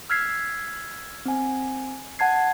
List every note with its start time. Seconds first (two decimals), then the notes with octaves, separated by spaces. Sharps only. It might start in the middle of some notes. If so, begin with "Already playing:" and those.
0.10 E6 F6 G#6 B6 C7
1.26 C4 G#5
2.19 F#5 A5 G#6 C7